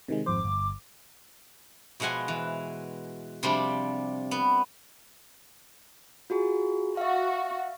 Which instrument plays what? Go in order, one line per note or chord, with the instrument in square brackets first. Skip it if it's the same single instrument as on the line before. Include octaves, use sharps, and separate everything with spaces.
[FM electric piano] C3 D#3 G#3
[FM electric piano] G#1 F2 C5 [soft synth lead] D6
[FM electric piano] G1
[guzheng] B2 F3 G#3 F#5 G#5
E3
C3 F3 G3 D4 C5
B3
[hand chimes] F4 F#4 G#4
[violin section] F#4 [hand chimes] E5 F5